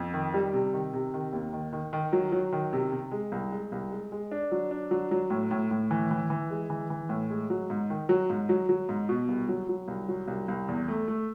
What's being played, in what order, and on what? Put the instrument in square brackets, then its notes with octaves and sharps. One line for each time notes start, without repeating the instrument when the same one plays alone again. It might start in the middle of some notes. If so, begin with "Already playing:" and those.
Already playing: [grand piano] F2
D#3
G3
C3
D#3
C3
D#3
D#2
D#3
D#3
D#3
F#3
F#3
D#3
C3
C3
G#3
C2
G#3
C2
G#3
G#3
D4
F#3
D4
F#3
F#3
A2
A2
A2
E3
E3
E3
G#3
E3
E3
A2
G#3
F#3
G#2
D#3
F#3
G#2
F#3
F#3
G#2
B2
C2
F#3
F#3
C2
F#3
C2
C2
E2
A3
A3